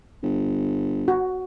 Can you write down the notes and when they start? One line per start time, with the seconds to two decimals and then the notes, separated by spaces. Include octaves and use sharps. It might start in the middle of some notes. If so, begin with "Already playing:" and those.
0.23 G1
1.08 F#4